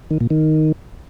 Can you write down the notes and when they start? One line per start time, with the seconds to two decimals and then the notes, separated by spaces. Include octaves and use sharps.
0.11 D#3
0.21 A#2
0.30 D#3